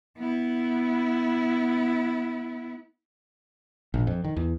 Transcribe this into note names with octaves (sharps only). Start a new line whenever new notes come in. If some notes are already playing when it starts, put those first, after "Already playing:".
B3 E4
A#1
F2
D#3
E2